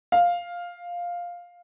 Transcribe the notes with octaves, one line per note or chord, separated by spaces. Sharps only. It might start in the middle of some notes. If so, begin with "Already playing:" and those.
F5